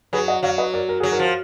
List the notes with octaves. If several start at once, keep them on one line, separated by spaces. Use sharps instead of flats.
F#3 G#4 B4
D#5 F#5
F#3 D5 F5
B4 D#5
A#4 D5
A#4
F#3 G#4
F#4 A#4
F3